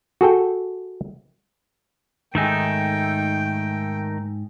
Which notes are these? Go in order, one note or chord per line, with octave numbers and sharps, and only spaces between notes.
F#4 G#4 A4 G5
G#2 D#3 A3 D#4 G#4 G5